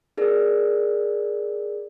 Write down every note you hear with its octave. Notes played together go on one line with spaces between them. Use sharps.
D#4 G#4 A#4 D5